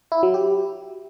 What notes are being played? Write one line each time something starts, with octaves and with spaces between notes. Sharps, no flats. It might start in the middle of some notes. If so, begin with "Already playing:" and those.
E4
F#3
G4